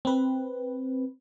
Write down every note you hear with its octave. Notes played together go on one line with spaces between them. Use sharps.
C4 B4